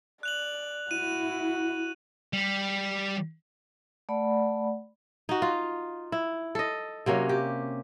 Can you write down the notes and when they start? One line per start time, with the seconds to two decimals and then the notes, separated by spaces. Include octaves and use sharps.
0.23 D5 F#6 F7 F#7
0.91 E4 F#4 D#7
2.33 G3
4.09 A3 D5 F#5 B5
5.29 D#4 F#4
5.42 F4
6.12 E4
6.55 A4 D#5
7.06 C3 F#3 A#3 C#4
7.29 G4